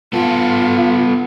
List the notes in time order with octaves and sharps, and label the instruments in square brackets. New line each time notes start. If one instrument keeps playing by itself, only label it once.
[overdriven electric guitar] B3 A4 [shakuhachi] F4